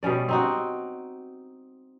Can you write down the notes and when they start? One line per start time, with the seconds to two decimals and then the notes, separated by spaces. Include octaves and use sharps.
0.03 B2 G3 C#4 D5
0.28 C4 D#4 F#4